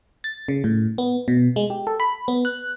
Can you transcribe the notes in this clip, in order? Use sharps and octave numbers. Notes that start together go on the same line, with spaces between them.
A6
C#3
A2
B3
B2
G#3
G4
A4
B5
B3
F#6